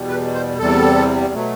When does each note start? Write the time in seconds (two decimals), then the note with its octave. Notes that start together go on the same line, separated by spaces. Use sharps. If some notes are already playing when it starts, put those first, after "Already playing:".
Already playing: E2 B2 G3
0.09 B4
0.34 C5
0.59 E2 C3 G3 A4
1.34 B2 F#3 A3